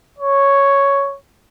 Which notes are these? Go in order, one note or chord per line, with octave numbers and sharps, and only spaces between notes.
C#5